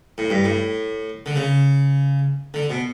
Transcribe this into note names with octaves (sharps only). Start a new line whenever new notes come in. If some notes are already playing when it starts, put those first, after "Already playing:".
A2
G2
A2
D3
C#3
D3
B2